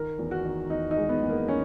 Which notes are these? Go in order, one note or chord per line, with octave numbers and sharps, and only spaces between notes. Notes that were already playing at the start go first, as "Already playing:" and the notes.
Already playing: D#3 A#4
E2
F#4
D#3
E2 D#4
D#4
G#3
B3
E2
A#3
D#3 C#4